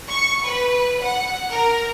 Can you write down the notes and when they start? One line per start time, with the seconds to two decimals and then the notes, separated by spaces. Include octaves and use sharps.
0.10 C#6
0.46 B4
1.02 F#5
1.50 A#4